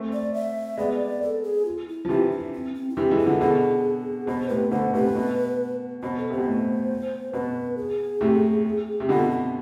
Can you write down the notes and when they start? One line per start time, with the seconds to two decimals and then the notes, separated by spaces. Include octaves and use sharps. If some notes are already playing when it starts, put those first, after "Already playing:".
Already playing: A3 C4
0.13 D5
0.34 E5
0.77 G#3 B3 D5
1.22 A4
1.44 G#4
1.65 F4
1.88 E4
2.05 F3
2.09 C3 E3 F4
2.31 D4
2.53 C4
2.74 C4
2.90 E4
2.96 C3 E3 D4
3.11 E3 G#3
3.18 E4
3.26 D3 F3
3.41 B2 D3 G#4
4.27 B2 C5
4.49 A2 C3 B4
4.71 B2 D3 C5
4.93 A2 C3 B4
5.07 A2
5.15 B2
6.03 B2 C5
6.18 A4
6.30 C3 C5
6.38 B2
6.47 A2
7.33 B2 B4
7.77 G#4
8.21 A2 C3
9.00 C3
9.09 B2 D3 F4
9.31 C4